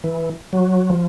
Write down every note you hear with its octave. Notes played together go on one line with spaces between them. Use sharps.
E3
F#3
F3